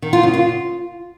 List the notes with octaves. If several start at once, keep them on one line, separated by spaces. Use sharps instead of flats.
D#3
F4
C#3
F4